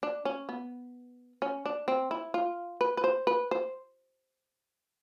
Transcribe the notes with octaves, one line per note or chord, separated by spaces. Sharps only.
D4
C#4
B3
C#4
D4
C4
E4
F4
B4
B4
C5
B4
C5